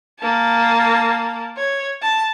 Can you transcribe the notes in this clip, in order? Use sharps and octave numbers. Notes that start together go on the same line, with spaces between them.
A#3 A5
C#5
A5